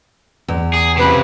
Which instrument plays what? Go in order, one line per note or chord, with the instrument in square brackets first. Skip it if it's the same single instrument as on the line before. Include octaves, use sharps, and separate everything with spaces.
[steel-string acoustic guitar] E2
[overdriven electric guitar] G#4
[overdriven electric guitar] C#2 C3 [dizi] B4